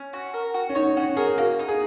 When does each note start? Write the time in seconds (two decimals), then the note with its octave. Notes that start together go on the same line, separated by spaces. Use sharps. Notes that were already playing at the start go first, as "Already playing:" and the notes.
Already playing: C#4
0.13 F#4
0.34 A#4
0.54 F#4
0.69 C#4
0.75 D#4 C#5
0.97 C#4 F#4
1.17 G#4 A#4
1.38 A#3 F#4
1.59 D#4
1.68 G#4